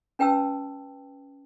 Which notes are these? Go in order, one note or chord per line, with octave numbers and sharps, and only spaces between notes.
C#4 B4 G5 A5 E6